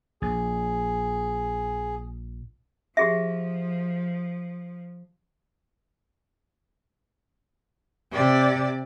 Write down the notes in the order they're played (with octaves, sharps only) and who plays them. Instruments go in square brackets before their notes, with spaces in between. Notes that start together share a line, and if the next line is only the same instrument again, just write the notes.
[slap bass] A#1 [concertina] G#4
[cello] F3 [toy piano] G4 G#4 E5
[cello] C3 D5